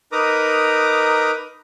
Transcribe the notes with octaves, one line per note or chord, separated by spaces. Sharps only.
D#4 A#4 B4 A#5 D6 D#6